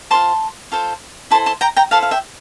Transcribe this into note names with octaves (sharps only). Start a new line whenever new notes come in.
F4 A4 C5 A5 C6
F4 A4 C5
E4 A4 C5 A5 C6
A5 C6
G5 A#5
G5 A#5
E4 A4 C5 F5 A5
F5
E5 G5